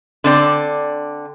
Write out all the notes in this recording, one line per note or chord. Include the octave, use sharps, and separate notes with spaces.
D3 C4 D5